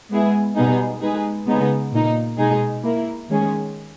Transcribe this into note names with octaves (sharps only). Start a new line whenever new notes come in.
G#3 B3 E4 G#4
B2 G3 B3 D#4 G#4
G#3 D#4 G#4 B4
C#3 G#3 B3 D#4 G#4
A#2 A#3 D#4
B2 G#3 D#4 G#4
A#3 E4 A#4
D#3 G#3 C#4 G#4